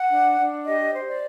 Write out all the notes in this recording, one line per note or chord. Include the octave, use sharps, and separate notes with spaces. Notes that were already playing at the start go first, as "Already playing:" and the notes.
Already playing: F#5
D4
D4
G4 D#5
C5
D5